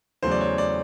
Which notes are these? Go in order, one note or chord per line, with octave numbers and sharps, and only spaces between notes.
E2 C#3 F#3 A3 C5
D5
C#5
D5